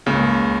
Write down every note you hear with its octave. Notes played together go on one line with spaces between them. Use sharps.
C#2 C#3 A#3